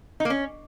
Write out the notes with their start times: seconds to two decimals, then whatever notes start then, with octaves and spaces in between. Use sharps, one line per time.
0.20 D#4
0.25 A#3
0.30 C#4